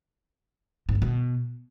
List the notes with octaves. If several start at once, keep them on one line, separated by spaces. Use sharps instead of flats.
G#2
F#2
B2